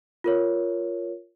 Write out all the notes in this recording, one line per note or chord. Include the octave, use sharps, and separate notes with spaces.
F4 A#4 C#5